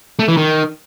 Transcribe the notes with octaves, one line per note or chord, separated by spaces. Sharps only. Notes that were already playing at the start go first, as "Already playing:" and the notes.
A3
E3
D#3